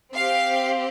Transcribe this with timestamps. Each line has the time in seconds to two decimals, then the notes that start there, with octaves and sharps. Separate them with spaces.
0.14 C4 G4 F5